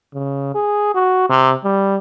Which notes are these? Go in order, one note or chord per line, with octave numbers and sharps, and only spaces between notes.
C#3
G#4
F#4
C3
G3